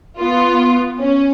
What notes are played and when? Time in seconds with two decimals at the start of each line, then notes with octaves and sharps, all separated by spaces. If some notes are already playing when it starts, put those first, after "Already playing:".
0.17 B3 F4
0.98 C#4